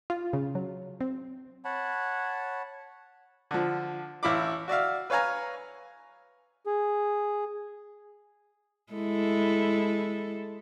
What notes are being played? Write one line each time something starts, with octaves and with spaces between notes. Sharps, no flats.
F4
C#3
F#3
C4
C#5 F#5 A5 B5
D3 F3
A1 E4 F5 B5 D6
F#4 D5 E5 F5
B4 C#5 F5 G#5 A#5
G#4
G#3 E4 A4